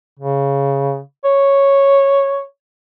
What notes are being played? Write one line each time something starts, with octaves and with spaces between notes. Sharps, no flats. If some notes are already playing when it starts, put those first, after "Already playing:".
C#3
C#5